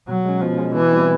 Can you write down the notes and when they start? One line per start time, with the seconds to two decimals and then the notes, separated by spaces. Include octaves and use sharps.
0.08 B2 F#3
0.25 G#3 C#4
0.41 B2 F3
0.58 G#3 C#4
0.75 B2 E3
0.93 G3 C4 E4